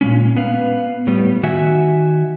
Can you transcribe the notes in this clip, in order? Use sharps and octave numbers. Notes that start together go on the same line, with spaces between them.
A#2 D3 G#3 C#4
B3 B4 F5
A2 G3 B3
D#3 F#4 E5 G#5